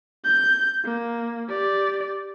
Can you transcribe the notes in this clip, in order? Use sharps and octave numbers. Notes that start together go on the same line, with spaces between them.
G6
A#3
G4 D5